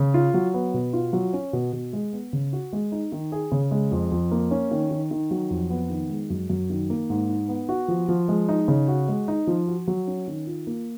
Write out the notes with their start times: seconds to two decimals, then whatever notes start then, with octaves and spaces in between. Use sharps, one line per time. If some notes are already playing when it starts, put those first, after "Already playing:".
Already playing: C#3
0.14 F4
0.34 F#3
0.54 B3
0.74 B2
0.93 F4
1.13 F#3
1.33 C#4
1.53 B2
1.73 B2
1.93 G#3
2.13 B3
2.33 C#3
2.53 F#4
2.73 G#3
2.92 D#4
3.12 D#3
3.32 G#4
3.52 C#3
3.71 G#3
3.92 F2
4.12 F2
4.32 A#3
4.51 C#4
4.71 D#3
4.91 D#3
5.11 D#3
5.31 F#3
5.50 F2
5.70 B3
5.90 D#3
6.09 G#3
6.30 F#2
6.50 F#2
6.70 D#3
6.90 A#3
7.10 G#2
7.29 D#4
7.49 B3
7.69 F#4
7.88 F3
8.08 F3
8.28 G#3
8.49 D#4
8.68 C#3
8.88 F#4
9.08 G#3
9.28 D#4
9.47 F3
9.67 F#4
9.88 F#3
10.07 C#4
10.27 D#3
10.47 F4
10.67 A#3